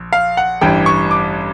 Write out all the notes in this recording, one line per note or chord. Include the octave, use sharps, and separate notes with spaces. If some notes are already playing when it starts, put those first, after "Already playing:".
Already playing: A#1
F5
F#5
A1 G2 E3 G3 G5
C#6
D6